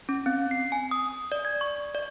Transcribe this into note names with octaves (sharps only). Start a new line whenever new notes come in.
C#4
C4
C7
G#5
D#6
D5
G#6
C#6
D5